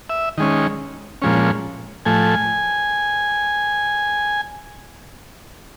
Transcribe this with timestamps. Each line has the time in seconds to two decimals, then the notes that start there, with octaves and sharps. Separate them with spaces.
0.10 E5
0.38 D#3 G#3 C#4
1.22 A#2 F3 G#3 C#4
2.06 A2 F3 A3 G#5